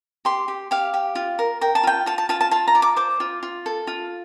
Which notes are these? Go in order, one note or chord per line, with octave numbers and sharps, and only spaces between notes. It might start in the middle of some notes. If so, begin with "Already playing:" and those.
G4 C6
G4
G4 F5
G4
F4
A#4
A#4 G5
A5
F4 G5
F4 A5
A5
F4 A5
A5
F4 A5
A#5
D5
D6
C5 D6
F4
F4
A4
F4